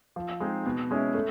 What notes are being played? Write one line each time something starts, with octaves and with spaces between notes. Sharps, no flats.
F3
G#3 C4 D#4 G#4
B2
G#3 C#4 E4
A3